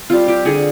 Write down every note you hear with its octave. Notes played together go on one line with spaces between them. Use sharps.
G3 C4 F4
G4
D3 G#4